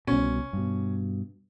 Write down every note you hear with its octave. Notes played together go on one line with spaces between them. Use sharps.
C2 B2 C#4
G2 B2